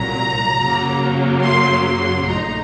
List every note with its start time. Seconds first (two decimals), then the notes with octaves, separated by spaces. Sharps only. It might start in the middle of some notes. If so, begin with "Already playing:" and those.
Already playing: C2 A#2 F#3 A#5
0.58 F#2 C#3 F#3 A#3
1.43 C6
1.85 C6
2.29 A#1 A#2 A3 D#4 A#5